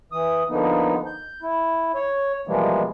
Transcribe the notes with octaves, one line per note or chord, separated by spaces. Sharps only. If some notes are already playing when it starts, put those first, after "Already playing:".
E3 D#6
D3 F3 A#3 B3 D#4
G6
E4
C#5
B2 E3 F3 G3 G#3 A#3